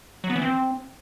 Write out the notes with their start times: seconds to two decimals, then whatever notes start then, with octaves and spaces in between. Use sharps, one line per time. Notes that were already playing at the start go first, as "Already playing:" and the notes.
0.24 F#3
0.30 B3
0.36 E3
0.42 C4